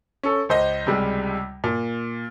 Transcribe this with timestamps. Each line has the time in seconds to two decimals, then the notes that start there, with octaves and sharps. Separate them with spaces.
0.23 C#4 A4
0.49 C#2 C5 D#5
0.86 C#2 C3 G3 G#3
1.64 A#2